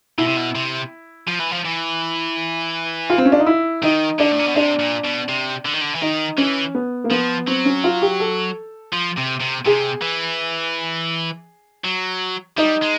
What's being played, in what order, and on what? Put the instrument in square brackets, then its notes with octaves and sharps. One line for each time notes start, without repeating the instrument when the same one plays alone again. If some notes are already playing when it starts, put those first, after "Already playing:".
[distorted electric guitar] B2 [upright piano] E4
[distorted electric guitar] C3
B2
C3
F3
E3
F3
E3
[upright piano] F4
C4
C#4
D4
D#4
E4
[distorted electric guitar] D#3 [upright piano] D#4
[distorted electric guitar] D3 [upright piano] D4
[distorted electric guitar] A2
A#2
B2
[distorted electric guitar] C3 [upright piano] D4
[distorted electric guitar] A#2
B2
C3
D3
D#3
D3
E3
[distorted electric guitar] D#3 [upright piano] D#4
[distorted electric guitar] E3 [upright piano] C#4
[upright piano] B3
A#3
[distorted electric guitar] F3 [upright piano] B3
[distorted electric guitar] F#3 [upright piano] C4
[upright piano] C#4
F4
G4
A4
[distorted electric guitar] F3
C3
C3
[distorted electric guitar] C3 [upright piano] G#4
[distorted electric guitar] E3
F#3
[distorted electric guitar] G3 [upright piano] D#4
[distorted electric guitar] G#3